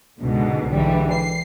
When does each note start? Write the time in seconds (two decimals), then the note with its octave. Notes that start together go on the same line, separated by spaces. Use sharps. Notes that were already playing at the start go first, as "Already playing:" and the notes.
0.19 C#2 G#2 B2 D3
0.69 B1 G#2 D3 E3 G3
1.11 C7